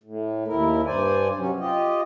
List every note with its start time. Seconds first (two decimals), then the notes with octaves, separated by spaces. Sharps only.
0.04 A2
0.48 D#2 E4 A#4
0.86 G2 C5 D5 G#5
1.37 C3 F#3 C#4
1.60 F4 G4 D#5